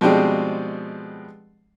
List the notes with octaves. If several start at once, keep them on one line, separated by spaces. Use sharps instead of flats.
B2 F3 G3 G#3 C4 D4